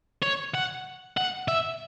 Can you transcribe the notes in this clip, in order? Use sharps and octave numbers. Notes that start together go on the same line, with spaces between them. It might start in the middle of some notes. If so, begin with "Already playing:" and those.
C#5
F#5
F#5
E5